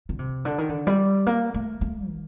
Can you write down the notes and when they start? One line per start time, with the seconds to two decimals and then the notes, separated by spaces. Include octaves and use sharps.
0.09 D3
0.19 C3
0.45 D3
0.58 D#3
0.69 D3
0.87 G3
1.26 A#3
1.54 A3
1.81 A3
2.08 D#3